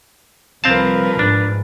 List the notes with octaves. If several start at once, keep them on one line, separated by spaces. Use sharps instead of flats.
C2 F3 C4 A#4 B4 F5 A5
G#2 D4